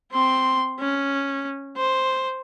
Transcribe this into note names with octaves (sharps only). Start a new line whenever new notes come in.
C4 C6
C#4
C5